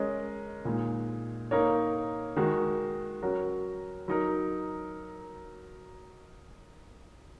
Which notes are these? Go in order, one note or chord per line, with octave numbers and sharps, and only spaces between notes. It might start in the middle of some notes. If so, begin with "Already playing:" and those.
Already playing: G#3 C#4 A#4 D#5
A#2 G#3 D#4
A#3 D#4 A#4 C#5
D#3 G#3 D#4 F#4
F#3 C#4 F#4 A#4
F#3 D#4 A#4